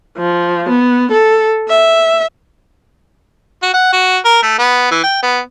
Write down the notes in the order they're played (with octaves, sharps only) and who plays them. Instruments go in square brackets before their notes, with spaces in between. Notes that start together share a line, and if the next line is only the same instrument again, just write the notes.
[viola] F3
B3
A4
E5
[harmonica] F#4
F#5
F#4
A#4
A3
B3
E3
G5
B3